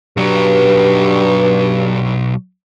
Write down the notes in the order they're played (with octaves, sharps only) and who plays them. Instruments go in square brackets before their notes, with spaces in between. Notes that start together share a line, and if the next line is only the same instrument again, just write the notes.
[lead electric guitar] B1 F#3 [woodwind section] G2